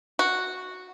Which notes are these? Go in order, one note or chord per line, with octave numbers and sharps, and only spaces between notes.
F#4